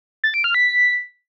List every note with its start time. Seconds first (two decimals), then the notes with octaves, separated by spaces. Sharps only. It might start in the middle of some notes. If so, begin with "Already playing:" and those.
0.24 A6
0.34 D7
0.44 F6
0.54 B6